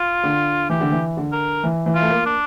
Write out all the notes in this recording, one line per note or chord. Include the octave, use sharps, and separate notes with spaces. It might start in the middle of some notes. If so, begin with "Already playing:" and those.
Already playing: F4
D3
E3 G4
D3
E3
D3
A#4
E3
E3
F4
A3
A#3
D4